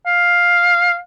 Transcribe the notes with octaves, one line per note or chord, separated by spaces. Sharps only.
F5